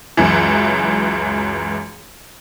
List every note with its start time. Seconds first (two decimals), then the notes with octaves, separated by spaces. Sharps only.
0.17 C#2 F#2 E3